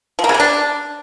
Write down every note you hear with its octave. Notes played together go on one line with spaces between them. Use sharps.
F3
A#3
C#3
C3
D4